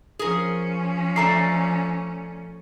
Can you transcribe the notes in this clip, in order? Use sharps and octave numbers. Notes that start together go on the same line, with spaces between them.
F3 C#4 G#4 A#4
A3 A4 D5 A#5 C7